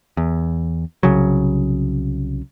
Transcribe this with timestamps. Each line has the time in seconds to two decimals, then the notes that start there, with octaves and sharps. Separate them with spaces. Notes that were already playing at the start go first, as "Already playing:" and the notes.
0.17 E2
1.03 C2 C#3 F#3